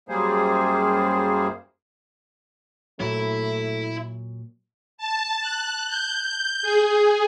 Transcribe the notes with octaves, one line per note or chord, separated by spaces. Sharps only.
F#2 G3 A#3 G#4 C5
A#2 F#3 A3 E4
A5
F#6
G6
G#4